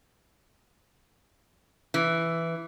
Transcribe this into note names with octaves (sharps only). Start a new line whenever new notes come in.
E3